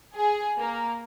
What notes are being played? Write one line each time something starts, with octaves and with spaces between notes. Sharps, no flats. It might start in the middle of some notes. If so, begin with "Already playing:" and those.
G#4
A#3